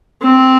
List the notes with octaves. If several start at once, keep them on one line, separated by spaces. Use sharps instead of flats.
C4